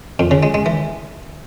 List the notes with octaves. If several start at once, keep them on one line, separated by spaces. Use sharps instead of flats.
F2
C#3
G#3
G#3
E3